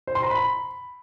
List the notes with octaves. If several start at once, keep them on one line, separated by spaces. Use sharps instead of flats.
C5
C6
A#5
B5